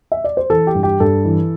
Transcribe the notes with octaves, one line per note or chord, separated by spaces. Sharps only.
E5
D5
C5
E3 A4
G4
G2
G4
G2 A4
E3